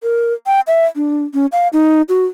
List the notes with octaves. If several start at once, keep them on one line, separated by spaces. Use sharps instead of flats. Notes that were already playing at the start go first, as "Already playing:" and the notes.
A#4
G5
E5
D4
C#4
F5
D#4
F#4